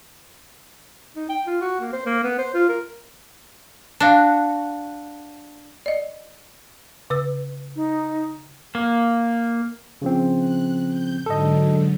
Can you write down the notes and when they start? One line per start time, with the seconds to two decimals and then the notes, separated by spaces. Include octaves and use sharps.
1.16 D#4
1.29 G5
1.46 F4
1.61 F#4
1.80 A#3
1.93 C5
2.05 A#3
2.24 B3
2.38 C5
2.54 F4
2.69 A#4
4.00 D4 F#4 F5 A5
5.86 D5 D#5
7.10 C#3 B4 E6
7.76 D#4
8.75 A#3
10.02 C#3 F3 C4
10.39 F#6
10.90 G6
11.26 G#2 D3 F#3 A4 D#5